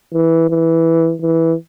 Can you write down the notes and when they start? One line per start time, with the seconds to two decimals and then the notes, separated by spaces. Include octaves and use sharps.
0.14 E3
0.50 E3
1.22 E3